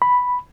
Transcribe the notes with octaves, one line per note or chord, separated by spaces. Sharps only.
B5